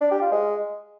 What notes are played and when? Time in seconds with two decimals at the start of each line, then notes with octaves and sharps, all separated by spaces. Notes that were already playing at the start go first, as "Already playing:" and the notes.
0.01 D4
0.11 G4
0.21 F4
0.32 G#3